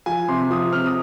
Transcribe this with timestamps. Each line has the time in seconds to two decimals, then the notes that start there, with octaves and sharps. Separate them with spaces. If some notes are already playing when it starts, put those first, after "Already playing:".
0.06 F3 G#5
0.28 C3 C6
0.50 F3 D#6
0.72 C4 F6
0.86 D#6